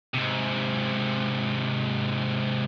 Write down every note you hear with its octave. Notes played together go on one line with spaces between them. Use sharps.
G#2 C3